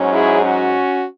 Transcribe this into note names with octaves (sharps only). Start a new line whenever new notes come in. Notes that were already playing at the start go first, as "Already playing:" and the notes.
Already playing: G#2 F#3 C#4
E4 G#4
C#4 F#4